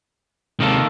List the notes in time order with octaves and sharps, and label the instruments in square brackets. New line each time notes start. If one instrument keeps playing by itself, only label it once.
[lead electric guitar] C3 G#3 [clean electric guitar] D#3 A#3 A4